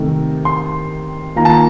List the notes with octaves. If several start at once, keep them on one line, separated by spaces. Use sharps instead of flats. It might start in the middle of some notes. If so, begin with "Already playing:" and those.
Already playing: C3 D#3 A3
C6
D#3 A#3 F4 A#5
A5
A#5